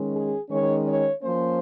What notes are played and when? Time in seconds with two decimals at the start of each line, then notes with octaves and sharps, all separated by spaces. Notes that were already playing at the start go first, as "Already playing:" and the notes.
Already playing: D#3 G#3 C#4
0.13 G#4
0.49 D#3 G#3 C#4 C#5
0.86 C#5
1.21 F3 A#3 C#4 C5